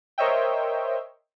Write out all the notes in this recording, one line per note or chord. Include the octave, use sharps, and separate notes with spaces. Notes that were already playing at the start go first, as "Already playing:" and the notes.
A#4 C5 C#5 D#5 E5 G5